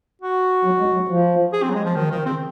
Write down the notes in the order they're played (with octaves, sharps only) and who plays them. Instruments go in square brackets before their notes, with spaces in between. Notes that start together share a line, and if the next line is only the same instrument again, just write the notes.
[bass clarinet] F#4
[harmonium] F#3
G#3
F#3
F3
[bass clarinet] G#4
C4
F#3
G#3
F3
[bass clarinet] D#3 [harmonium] F#3
[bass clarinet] D#3 [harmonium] F3
[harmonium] C#3 [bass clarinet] C4